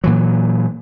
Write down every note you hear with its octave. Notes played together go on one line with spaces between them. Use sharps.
A#2 E3 F#3